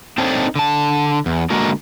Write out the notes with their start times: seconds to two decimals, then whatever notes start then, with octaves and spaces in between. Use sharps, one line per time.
0.18 C4 D4 D#4 A4 C5 C#5
0.56 D3 A5
1.26 E2
1.50 D3 G#3 A#3 F#4 A#4